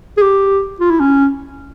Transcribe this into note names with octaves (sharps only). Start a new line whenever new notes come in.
G#4
G4
F4
E4
C#4